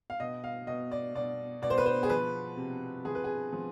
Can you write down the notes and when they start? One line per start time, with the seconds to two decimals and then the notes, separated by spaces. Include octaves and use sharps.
0.10 F5
0.20 B2 D#5
0.44 F5
0.67 B2 D#5
0.91 D5
1.15 B2 D5
1.62 B2 D5
1.70 C5
1.78 B4
1.86 C5
2.03 G#4
2.09 F3 B4
2.57 C3
3.05 F3 G#4
3.15 B4
3.24 G#4
3.53 F3